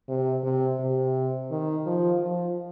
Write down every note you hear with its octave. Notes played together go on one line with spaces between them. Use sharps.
C3
C3
C3
D#3
F3
F3